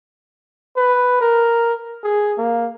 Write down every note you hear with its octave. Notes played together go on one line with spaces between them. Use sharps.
B4
A#4
G#4
A#3